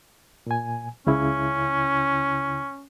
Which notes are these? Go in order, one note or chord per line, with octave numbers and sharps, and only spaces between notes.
A#2 G#5
C#2 C#3 C#4 E4